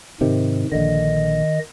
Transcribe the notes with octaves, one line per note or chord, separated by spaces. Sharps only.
G#2 C3 D#3
A#1 D3 D#3 D#5